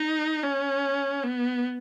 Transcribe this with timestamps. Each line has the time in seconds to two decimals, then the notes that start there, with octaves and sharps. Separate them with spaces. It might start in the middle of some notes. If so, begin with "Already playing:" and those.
Already playing: D#4
0.43 C#4
1.24 B3